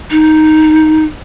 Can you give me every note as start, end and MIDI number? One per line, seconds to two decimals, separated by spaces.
0.11 1.04 63